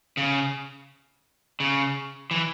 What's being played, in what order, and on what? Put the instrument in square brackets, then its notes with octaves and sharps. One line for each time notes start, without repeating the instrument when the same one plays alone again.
[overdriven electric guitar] C#3
C#3
E3